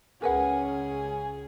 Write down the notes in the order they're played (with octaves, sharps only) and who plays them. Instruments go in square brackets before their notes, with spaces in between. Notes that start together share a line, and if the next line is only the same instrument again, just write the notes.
[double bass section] C#2 C#4 [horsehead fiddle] G#4 [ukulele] A#4 B4 F#5 [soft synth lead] G#5